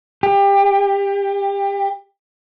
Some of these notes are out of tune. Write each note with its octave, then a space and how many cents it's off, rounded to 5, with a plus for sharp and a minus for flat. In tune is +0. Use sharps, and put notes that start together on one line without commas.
G4 +25